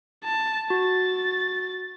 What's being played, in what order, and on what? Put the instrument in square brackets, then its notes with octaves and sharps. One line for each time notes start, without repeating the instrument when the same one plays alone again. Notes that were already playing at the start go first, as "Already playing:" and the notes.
[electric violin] A5
[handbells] F#4 [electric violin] A6